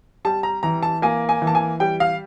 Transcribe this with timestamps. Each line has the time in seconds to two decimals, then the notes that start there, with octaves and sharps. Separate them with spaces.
0.25 G3 A5
0.43 A#5
0.63 E3 A#5
0.83 A5
1.02 A#3 G#5
1.29 G#5
1.42 E3
1.47 A5
1.55 G#5
1.80 G3 G5
2.00 F5